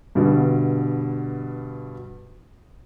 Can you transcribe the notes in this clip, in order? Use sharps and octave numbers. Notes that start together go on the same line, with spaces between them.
G2 B2 D3